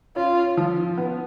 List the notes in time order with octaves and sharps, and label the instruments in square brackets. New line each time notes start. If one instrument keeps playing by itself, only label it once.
[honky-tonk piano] C#4 [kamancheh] F4
[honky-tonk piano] F3
B3